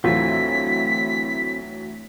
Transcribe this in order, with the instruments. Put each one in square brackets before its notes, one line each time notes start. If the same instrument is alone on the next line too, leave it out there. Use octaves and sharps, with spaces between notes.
[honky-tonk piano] D2 E3 F#3 [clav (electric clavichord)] A3 F4 [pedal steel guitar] C4 E4 [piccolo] B6